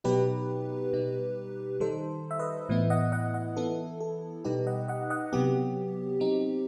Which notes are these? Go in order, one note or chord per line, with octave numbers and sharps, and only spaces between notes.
B2 F#3 B3 D#4 G4 B4
B2 G3 D#4
D#3 G3 D#4 A4 C5
E5
B4 D#5
A2 E3 B3 E4
D#5 F#5
D#5 F#5
D#5 F#5
E3 B3 E4 A4
A4
B2 G3 D#4 G4 B4
D#5 F#5
D#5 F#5
D#5 F#5
C3 F#3 B3 G4
F#3 C4 D#4